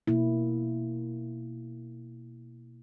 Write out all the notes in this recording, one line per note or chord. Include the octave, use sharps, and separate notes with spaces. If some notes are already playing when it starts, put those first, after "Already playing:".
B2 A#3 E4